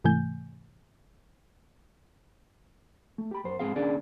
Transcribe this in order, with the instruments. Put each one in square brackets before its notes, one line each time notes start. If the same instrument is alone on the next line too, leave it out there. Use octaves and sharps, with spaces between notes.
[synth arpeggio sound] G#2 C3 E3 A3 G#5 G6
[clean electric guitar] A3
G4 B5
F#2 C5
G#2 C3 C4 G#4 F5
D#2 C#4 D4 G#4 D5